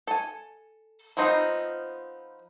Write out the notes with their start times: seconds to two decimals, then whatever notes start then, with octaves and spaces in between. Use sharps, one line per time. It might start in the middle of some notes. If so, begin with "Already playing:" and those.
0.07 A4 G#5
1.17 F3 B3 C4 D#4 F4